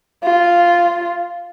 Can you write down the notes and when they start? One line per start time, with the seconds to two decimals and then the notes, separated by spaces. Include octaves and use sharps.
0.24 F4